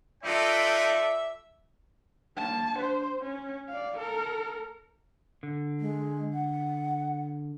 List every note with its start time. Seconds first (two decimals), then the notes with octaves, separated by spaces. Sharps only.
0.24 D#4 F4 A4 B4 D5 E5 G5
2.38 A#3 A5
2.76 D4 C5
3.19 C#4
3.69 D5 F5
3.98 A4 A#4
5.43 D3
5.80 G#3
6.33 F#5